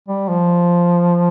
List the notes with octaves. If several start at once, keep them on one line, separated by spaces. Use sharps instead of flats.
G3
F3